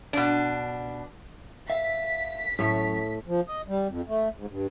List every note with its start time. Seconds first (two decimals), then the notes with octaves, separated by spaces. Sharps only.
0.13 B2 D4
1.70 E5 F5 B6
2.59 F#2 A2 A3 C#5
3.26 F3
3.47 D#5
3.68 G3
3.89 F2
4.08 A3
4.37 G#2
4.50 G2